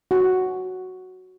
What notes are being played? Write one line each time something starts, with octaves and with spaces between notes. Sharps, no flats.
F#4